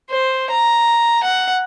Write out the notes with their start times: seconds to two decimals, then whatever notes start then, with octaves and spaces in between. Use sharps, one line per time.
0.11 C5
0.51 A#5
1.24 F#5